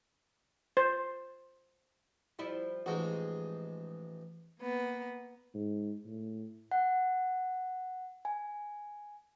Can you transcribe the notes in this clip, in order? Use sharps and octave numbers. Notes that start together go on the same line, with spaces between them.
C5
F3 G3 E4
A1 F3 G#3 D#4 F#4
A#3 B3
G#2
A2
F#5
G#5